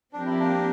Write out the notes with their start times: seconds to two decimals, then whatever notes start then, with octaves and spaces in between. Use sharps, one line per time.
0.12 F3 C4 D4 G4 A#4
0.26 E4
0.39 A#3 D4